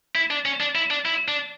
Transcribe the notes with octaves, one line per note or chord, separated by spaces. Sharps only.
E4
D4
C#4
D4
E4
D4
E4
D4